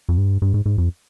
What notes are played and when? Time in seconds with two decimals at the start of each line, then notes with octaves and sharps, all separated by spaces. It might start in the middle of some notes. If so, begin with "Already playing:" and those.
0.09 F2
0.18 G2
0.42 G2
0.54 G#2
0.66 G#2
0.78 F2